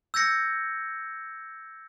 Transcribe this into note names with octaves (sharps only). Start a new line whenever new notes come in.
E6 G6 G#6 A#6 C#7